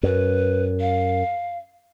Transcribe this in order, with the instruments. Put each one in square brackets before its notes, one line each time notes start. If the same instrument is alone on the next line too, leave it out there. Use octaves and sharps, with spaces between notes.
[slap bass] F#2 [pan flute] B4
[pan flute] F5